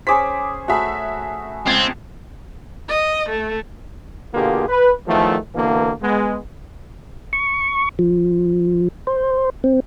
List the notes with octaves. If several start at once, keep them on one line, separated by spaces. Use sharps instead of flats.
C#4 G#4 C5 D6 B6
A3 F#4 G#4 E5 B5
C#2 C4 G#6 A6
D#5
A3
B2 D3 A#3 F4 G4 G#4
B4
E2 D#3 F3 F#3 A3
B2 D3 E3 A#3
G#3 B3
C#6
F3
C5
C4